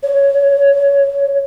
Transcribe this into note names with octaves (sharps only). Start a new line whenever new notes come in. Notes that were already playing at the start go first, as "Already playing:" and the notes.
C#5